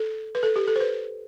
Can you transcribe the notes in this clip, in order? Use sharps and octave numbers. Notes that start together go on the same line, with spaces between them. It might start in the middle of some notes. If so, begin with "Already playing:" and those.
Already playing: A4
B4
A4
G4
A4
C5
B4